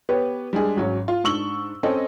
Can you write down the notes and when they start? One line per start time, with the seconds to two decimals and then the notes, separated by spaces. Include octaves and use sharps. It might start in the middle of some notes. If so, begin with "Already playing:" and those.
0.09 B3 G4 B4 C#5
0.53 G3 G#3 D4 G#4
0.77 G#1 F#3 C#4
1.08 F4
1.24 G#2 D4 C#6 E6 F#7 G7
1.83 C4 C#4 A4 D#5